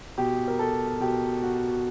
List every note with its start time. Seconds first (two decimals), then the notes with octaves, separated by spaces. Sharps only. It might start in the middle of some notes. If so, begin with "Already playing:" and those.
0.18 B2 G4
0.48 A#4
0.59 A4
1.00 B2 G4
1.42 F#4